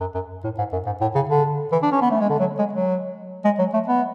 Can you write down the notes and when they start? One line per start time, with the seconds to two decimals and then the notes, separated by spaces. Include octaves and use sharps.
0.01 F#2
0.14 F#2
0.44 A2
0.58 G#2
0.72 F#2
0.86 G#2
1.01 A2
1.15 C#3
1.30 D3
1.72 E3
1.83 D4
1.92 C#4
2.01 B3
2.11 A3
2.20 G#3
2.30 D3
2.40 F#3
2.59 G#3
2.73 F#3
3.45 G#3
3.59 F#3
3.74 A3
3.88 B3